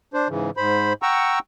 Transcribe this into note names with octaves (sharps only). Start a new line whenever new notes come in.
D4 C5
G#2 C#3 E3
G#2 C5 B5
F#5 G5 A#5 C#6 E6